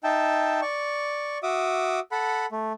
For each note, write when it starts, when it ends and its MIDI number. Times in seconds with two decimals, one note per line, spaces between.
0.04 0.60 63
0.04 0.60 76
0.04 0.60 79
0.04 0.60 81
0.62 1.38 74
0.62 1.38 85
1.43 2.00 66
1.43 2.00 76
1.43 2.00 86
1.43 2.00 87
2.12 2.46 69
2.12 2.46 78
2.12 2.46 83
2.52 2.73 57